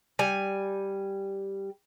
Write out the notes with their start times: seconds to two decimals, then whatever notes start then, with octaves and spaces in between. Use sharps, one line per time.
0.19 G3 G#5